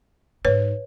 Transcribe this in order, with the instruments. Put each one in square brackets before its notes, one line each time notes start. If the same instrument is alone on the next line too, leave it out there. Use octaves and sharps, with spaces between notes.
[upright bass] G#2 D#4 [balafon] B4 C#5